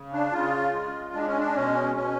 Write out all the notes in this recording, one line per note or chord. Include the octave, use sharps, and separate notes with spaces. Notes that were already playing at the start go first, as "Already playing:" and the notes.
Already playing: C#3
D4
C#3 F4
G#3
G#3 D4
C#4
D4
B2 C#4
B2 C#4